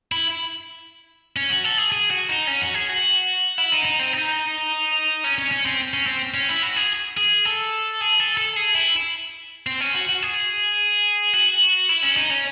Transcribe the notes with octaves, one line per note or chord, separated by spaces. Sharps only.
E4
C#4
F#4
A4
G#4
G#4
F#4
D#4
C#4
F#4
G#4
F#4
E4
D#4
D#4
C4
D#4
C#4
C#4
C#4
C4
C#4
C4
C#4
E4
F#4
G#4
G#4
A4
G#4
A4
A4
G#4
E4
C4
C#4
F#4
F#4
G#4
F#4
E4
C#4
D#4
C#4